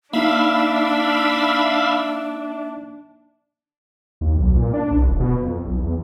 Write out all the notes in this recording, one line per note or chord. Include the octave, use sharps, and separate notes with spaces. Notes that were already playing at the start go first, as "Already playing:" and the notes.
A#3 D4 D#4 E5 F5 B5 E6
D#2
B1
A#2
D4
C2
D#1
B2
F2
B1
E2